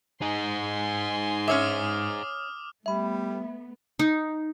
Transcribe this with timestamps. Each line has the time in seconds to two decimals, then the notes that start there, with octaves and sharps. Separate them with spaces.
0.22 D#4 G#4 G#5 C6
1.48 C#4 C#5 E5 D6 D#6 F6
2.86 G3 A3 B3 E5 B5
3.99 D#4